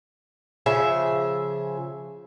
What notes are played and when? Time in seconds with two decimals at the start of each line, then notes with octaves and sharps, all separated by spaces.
0.66 C#3 F3 G#4 E5